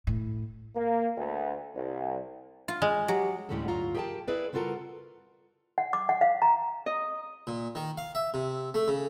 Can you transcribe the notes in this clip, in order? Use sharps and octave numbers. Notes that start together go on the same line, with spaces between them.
A2
A#3
D2
C2
F4
G#3
F#3 G4
D2 A2 G3 G#3 C#4 A4
D2 G2 F#3 F4 A#5
G4 G#4 A#4 D#5 G5 A5
E4 G#4 B4 D5
C#3 G3 F4 F#4 A4 A#4
F#5
D6
F#5
F5
A#5
D#5
A#2
D#3
F5
E5
C3
A3
C#3